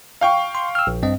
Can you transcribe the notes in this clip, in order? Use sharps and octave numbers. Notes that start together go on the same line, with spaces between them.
F5 G5 C#6
C6
E6 F6
A#1
G2 C4 D#5